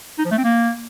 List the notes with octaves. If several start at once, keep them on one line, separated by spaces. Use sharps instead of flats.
D#4
F3
A3
C4
A#3